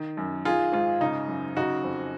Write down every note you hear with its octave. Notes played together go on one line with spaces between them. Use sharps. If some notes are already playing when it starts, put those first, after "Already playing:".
Already playing: D#3
F#2
D#3 F4 G#4
G#2 F4
C#3 D#4
F#2
C#3 D#4 F#4
F2